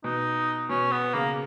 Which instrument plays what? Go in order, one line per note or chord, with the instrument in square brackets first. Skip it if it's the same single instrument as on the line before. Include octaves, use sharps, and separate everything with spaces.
[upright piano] B2 [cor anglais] D#4
[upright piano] B2 [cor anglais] C#4
[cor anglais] B3
[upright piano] C#3 [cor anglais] A#3